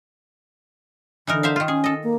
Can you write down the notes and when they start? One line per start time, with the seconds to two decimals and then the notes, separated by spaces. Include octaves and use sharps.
1.27 D3 E3 D#4 A#4
1.43 C5 E5 F5
1.56 D#3 F4
1.68 C#4 G#4
1.84 A4 D#5
2.04 A#3